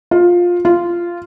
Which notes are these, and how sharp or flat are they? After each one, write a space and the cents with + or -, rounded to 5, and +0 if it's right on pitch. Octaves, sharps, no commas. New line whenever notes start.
F4 +15
F4 -10